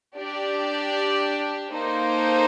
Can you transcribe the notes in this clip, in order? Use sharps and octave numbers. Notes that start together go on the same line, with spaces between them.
D4 G4 D5
A#3 D#4 A4 C5